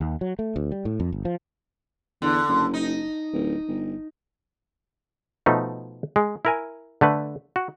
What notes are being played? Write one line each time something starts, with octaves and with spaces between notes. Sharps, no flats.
D#2
F#3
A3
D2
G3
A2
F2
G1
F3
E2 D3
F#1
D#4
D1
G1
B2 F3 A3 D#4
G#3
E4 A#4 G#5
D3 A3 B4
F#4